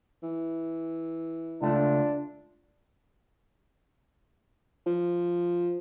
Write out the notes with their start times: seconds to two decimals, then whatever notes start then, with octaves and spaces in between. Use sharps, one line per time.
0.23 E3
1.62 C#2 A3 D4 F4
4.87 F3